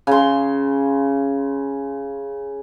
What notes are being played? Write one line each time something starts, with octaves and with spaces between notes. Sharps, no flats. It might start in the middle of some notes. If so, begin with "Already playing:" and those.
C#3 C6